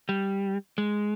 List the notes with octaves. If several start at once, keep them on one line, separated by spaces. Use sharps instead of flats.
G3
G#3